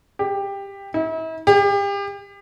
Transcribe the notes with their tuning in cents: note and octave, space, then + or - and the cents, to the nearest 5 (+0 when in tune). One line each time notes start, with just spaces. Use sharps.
G4 +15
E4 -40
G4 +35